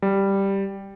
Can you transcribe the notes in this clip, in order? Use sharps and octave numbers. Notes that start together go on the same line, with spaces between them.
G3